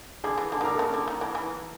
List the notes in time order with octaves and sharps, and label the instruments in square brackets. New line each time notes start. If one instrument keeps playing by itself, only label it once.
[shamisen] D3 [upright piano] G#4
[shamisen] E3
[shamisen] D3 [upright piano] A4
[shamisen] D#3
[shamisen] D3 [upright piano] A#4
[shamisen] C#3 [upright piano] A4
[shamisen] D3
D#3
E3
E3